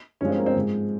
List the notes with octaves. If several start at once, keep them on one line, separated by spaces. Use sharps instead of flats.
G2 F3 G#3 C#4
C4
A#3
C4
G#2 F3 G#3